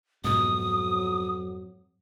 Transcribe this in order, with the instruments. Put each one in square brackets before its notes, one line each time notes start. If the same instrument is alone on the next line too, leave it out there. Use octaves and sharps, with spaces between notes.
[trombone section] F2 F#3 [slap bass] G#2 B2 [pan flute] D#6